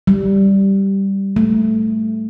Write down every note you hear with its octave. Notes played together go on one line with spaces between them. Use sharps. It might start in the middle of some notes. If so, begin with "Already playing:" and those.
G3
A3